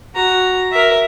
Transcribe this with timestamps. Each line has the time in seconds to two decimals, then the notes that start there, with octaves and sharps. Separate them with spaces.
0.15 F#4 A#5
0.72 A#4 E5